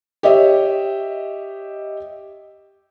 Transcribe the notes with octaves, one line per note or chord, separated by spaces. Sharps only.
G4 C#5 D#5 E5